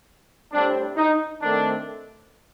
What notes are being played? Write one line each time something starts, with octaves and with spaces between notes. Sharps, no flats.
A2 G3 C4 D4
D#4
D#3 A3 C4 D4